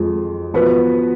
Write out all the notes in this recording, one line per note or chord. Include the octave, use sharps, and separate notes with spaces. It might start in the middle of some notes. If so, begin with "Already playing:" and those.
Already playing: F2 F3 G#3
F3 B3 F#4 B4